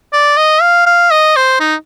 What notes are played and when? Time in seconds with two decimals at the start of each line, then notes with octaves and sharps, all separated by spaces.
0.13 D5
0.37 D#5
0.61 F5
0.86 F5
1.11 D#5
1.36 C5
1.60 D#4